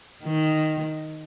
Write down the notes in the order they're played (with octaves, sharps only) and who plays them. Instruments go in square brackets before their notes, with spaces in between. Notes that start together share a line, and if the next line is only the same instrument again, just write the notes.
[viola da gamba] D#3